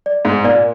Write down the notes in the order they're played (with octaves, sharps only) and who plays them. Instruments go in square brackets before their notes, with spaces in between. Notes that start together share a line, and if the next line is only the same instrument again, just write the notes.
[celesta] D5
[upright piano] G#2
[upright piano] A#2 [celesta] D5